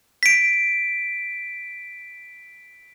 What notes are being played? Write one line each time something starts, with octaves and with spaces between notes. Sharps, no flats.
B6 D7